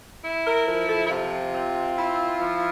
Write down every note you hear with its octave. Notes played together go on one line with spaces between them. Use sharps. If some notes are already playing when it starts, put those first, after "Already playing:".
E4
A#4
F3 A#4
A4
E4
C3 F4
C4
E4
F3